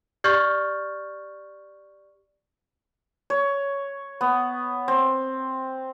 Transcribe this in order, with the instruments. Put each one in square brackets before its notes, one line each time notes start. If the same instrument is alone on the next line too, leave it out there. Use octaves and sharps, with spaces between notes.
[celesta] G4 D5 C#6 F6 G6 A6
[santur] C#5
B3
C4